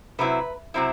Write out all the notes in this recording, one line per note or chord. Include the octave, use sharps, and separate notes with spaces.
C3 F#3 C4 E4 B4
C3 F#3 C4 E4